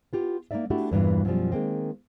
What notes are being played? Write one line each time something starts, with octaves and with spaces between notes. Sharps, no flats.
B3 F4 G4
A#3 B3 D#4 D5 E5
A3 D4 E4 F#4 G4 A4
E2 G2 A#2 E3
F#2 B2 F3 G3
D#3 G#3 A#3 C4